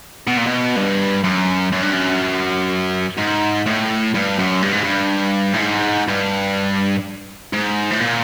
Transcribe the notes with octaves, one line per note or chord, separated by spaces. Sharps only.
B2
A#2
B2
G2
F#2
F#2
G2
F#2
G#2
A2
G2
F#2
G2
G#2
G2
A2
G#2
G2
G#2
A2
A#2